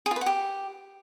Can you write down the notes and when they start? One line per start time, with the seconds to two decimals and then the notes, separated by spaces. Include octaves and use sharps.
0.06 G#4
0.11 F4
0.16 B4
0.21 F#5
0.26 G4